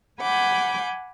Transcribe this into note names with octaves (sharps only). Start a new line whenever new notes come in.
F#5 G#5 B5 D6 G6